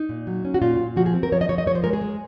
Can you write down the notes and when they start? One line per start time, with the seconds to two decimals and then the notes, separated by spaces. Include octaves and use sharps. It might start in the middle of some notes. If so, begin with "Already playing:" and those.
Already playing: D#4
0.09 A#2
0.27 F#3
0.45 C#4
0.54 F#4
0.62 A#2 F4
0.80 A#2
0.96 F3 F#4
1.06 G#4
1.14 C4
1.23 A#4
1.32 F3 C#5
1.41 D#5
1.49 F3 C#5
1.58 D#5
1.66 F3 C#5
1.75 C5
1.84 G#3 A#4
1.93 G#4
2.01 G#3